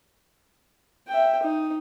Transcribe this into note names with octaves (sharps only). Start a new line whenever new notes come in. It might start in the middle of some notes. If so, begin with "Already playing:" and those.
E5 G5
D#4